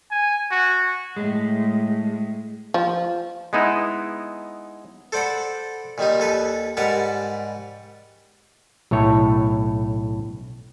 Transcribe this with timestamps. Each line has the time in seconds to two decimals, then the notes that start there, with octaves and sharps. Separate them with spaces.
0.11 G#5
0.51 F#4
1.17 A2 G#3
2.74 F3
3.53 G#3 B3 D#4 E4
5.12 A4 C5 D5 F#5 B5
5.98 A#2 D#3 G3 D#4
6.20 D#2 A4 B4
6.77 G#2 G3 A#4 B4 F#5 A5
8.91 B1 A2 A3 C#5